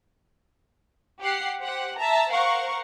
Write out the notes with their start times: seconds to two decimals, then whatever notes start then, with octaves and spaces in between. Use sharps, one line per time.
1.20 G4 F#5 C7
1.59 G4 C5 F#5
1.97 E5 A5 A#5
2.29 A#4 C5 F5 F#5 C#6